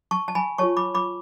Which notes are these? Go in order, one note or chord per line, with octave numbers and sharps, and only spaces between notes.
A5 C#6
A5
G#5 B5
F4 G#4 C#5 A5 C#6
B5 D6
B5 D6